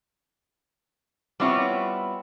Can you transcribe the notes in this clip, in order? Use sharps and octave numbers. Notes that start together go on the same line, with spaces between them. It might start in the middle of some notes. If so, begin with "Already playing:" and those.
G3 B3 C4 E4 F4 C#5